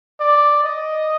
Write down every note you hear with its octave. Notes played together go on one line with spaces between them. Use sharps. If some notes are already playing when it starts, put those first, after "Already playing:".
D5
D#5